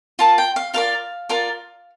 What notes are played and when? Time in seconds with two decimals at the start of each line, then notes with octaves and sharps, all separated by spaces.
0.19 F4 A#4 D5 A5
0.38 G5
0.56 F5
0.74 F4 A#4 D5 F5
1.29 F4 A#4 D5